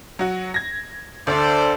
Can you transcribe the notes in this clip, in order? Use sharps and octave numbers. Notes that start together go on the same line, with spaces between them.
F#3 F#4
G#6 A#6
D2 D4 A4 C5 D5